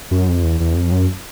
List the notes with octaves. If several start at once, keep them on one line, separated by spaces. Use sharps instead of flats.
F#2
F2
E2
E2
F2
F#2